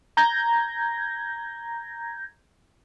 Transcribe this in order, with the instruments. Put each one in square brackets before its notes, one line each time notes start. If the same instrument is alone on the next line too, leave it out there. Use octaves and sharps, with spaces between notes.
[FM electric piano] A#5 G6 G#6 A#6